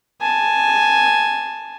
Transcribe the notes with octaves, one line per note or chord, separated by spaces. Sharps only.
G#5 A5